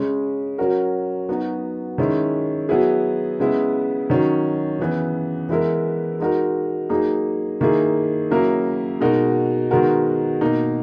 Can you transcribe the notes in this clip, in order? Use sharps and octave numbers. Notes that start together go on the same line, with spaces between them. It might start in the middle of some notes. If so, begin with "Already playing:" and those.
Already playing: C#3 G#3 C#4
F#3 C#4 F#4 A#4
F#3 B3 D#4 F#4
D#3 G#3 C#4 E4
F#3 B3 E4 G#4
C#3 G#3 B3 E4
D#3 F#3 C#4
C#3 E3 B3
E3 G#3 B3 E4 A#4
G#3 D#4 F#4 A#4
F#3 A#3 D#4 G#4
D#3 A#3 E4 G#4
C#3 F#3 A#3 E4 A#4
B2 G#3 D#4 F#4 A#4
D#3 G#3 B3 F#4 A#4
B2 A#3 D#4 A#4